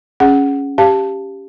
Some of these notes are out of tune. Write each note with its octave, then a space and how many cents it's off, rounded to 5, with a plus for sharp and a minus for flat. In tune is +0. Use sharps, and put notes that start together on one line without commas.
C#4 +0 G#4 +0 F#5 +5
G4 +0 F5 -15 A5 +0